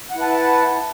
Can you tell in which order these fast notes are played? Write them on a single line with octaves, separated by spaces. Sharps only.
F#5 E4 B4 A5